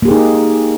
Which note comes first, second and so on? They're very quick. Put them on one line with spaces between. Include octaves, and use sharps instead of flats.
A#3 G4 G#4 D#4